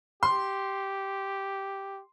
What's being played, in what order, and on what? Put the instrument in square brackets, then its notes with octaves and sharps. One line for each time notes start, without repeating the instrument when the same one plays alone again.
[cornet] G4 [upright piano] C6